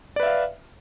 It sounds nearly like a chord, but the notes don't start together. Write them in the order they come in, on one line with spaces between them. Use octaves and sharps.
D5 B4 E5 F5